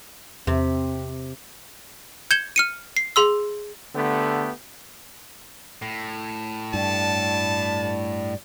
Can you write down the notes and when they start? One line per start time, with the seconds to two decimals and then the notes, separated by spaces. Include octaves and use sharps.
0.47 E2 C3 C4
2.31 G6 G#6 C#7 E7 G7
2.56 F6 C#7 D#7
2.97 C7
3.16 G#4 C6 E6
3.95 D3 A3 B3 G4
5.82 A2
6.74 G2 D5 A5